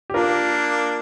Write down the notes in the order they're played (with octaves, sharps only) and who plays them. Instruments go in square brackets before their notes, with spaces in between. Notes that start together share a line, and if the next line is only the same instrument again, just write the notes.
[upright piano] G4
[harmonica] A#3 D4 [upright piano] F4 A#4